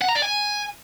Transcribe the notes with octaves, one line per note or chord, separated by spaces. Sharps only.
F#5
A#5
D5
G#5